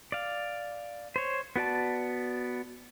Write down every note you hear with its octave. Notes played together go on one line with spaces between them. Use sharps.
D5 F5
C5 C#5
B3 F#4 D5 A5